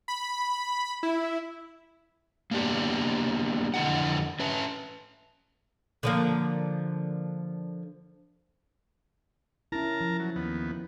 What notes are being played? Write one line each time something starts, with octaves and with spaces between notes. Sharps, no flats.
B5
E4
A#3 B3 D4 G4
F2 D3 E4 A4 D#5 F#5
C#4 B4 E5 A5
D3 F3 A#3
C#4 E4 A#4 A5 A#5
F3
F#3
D#2 B3